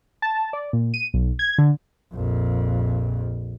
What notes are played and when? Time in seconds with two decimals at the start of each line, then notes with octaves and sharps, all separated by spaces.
0.22 A5
0.53 D5
0.73 A#2
0.94 D#7
1.14 B1
1.39 G#6
1.58 D3
2.14 A#1 F2